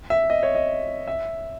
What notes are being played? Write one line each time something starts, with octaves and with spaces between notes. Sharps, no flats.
E5
D#5
C#5
D#5
E5